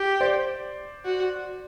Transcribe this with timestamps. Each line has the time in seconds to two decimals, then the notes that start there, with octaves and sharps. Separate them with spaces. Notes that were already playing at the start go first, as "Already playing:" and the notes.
Already playing: G4
0.21 C5 D5
1.05 F#4